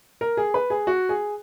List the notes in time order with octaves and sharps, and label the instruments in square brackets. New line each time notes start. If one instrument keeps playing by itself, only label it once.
[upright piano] A#4
G#4
B4
G#4
F#4
G#4